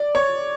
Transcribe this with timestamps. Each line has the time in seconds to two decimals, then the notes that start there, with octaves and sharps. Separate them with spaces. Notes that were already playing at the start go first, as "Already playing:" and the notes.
Already playing: D5
0.15 C#5